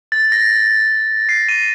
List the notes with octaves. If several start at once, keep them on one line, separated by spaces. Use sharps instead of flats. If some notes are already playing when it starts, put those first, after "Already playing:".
A6
A#6
C7
D#7